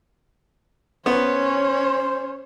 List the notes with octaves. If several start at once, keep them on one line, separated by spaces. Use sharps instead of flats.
B3 C#4 C5 C#5